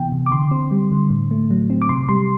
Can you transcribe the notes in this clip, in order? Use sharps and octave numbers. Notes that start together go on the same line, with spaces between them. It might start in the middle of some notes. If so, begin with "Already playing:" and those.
Already playing: C3 E3 B3 G5
C3
D6
D3 C6
C4
G3
D3
A2
A3
F#3
C4
D6
C3 C6
G3 C6